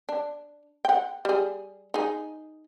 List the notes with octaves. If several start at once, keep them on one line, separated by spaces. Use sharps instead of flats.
D4
F#5 G5
G3 G#4
D#4 G#4